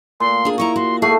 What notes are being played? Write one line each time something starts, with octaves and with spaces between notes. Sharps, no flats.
A#2 C6
D4 G#4
D#4 E4 A#5 C#6
F#4 C6
A3 F#4 G#4 C7